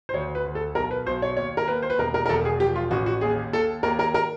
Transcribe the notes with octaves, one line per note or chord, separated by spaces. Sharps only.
C5
D2 C#5
B4
D2
A4
B1 A#4
B4
B1 C5
C#5
D#2 C#5
A#4
D#2 B4
C5
B4
E1 A#4
A#4
A#4
E1 A4
G#4
F3 G4
F4
A1 F#4
F#4
D#2 G#4
D#2 A4
D#2 A#4
A#4
A#4